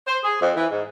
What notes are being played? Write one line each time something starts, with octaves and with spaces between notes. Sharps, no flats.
C5
G#4
F2
E3
G#2